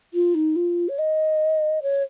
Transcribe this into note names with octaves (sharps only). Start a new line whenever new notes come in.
F4
D#4
F4
C#5
D#5
C#5